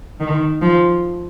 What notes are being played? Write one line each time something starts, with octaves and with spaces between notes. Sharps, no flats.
D#3
F3